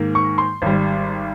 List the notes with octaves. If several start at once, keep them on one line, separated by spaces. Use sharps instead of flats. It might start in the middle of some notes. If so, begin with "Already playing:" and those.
Already playing: G#2 D#3 A#3
C#6
C6
G#1 G3